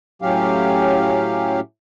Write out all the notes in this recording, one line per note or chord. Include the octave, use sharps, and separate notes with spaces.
A2 F#3 C#4 G4 F5